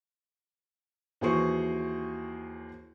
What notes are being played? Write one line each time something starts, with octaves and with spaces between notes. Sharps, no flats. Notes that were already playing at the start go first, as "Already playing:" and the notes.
D#2 E3 F#4 G#4 C5 C#6